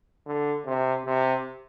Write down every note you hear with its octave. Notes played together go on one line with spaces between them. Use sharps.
D3
C3
C3